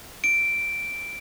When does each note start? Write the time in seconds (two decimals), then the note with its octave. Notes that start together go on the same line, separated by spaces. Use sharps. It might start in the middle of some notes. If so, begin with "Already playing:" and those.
0.24 D7